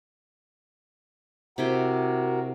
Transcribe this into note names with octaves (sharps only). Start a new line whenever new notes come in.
C3 E4 F#4 A#4 G5